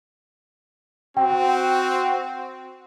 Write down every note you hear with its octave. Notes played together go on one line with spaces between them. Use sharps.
C4 F#4 G5